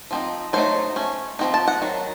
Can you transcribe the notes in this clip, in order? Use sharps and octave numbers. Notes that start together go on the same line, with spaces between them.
F3 C4 D#4
F#3 A3 D#4 C5
A3 C#4
F3 C4 D#4
A5
F#5
D#3 F#3